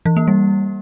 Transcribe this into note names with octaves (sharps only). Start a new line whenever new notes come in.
E3
A#3
G3